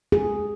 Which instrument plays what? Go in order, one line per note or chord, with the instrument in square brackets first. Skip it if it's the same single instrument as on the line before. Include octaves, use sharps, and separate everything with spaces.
[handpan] G#4